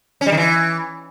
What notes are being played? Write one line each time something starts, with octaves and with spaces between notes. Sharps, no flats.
C#4
G3
D#3
E3